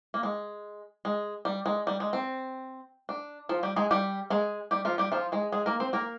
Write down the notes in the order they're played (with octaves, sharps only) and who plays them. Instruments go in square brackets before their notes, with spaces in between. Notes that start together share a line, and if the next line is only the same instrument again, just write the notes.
[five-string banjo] A#3
G#3
G#3
G3
G#3
G3
G#3
C4
D4
F3 F4
G3 G4
G#3 G#4
G3 G4
G#3 G#4
G3 G4
F3 F4
G3 G4
F3 F4
G#3 G#4
G#3 G#4
A#3 A#4
C4 C5
A#3 A#4